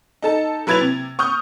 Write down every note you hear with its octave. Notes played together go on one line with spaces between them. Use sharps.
D#4 A4 A5
F#3 E4 B4 G#6 A6 F7
C3
C#6 D#6 F6 G6